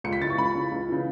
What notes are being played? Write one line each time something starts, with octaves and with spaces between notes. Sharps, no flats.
C#2 C#7
B6
C#3 E3 A6
C#6
C#2 B5
C#3 E3
C#2
C#3 E3